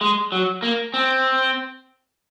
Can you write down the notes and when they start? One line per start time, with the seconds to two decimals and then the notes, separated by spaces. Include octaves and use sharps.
0.01 G#3
0.32 F#3
0.62 A#3
0.94 C4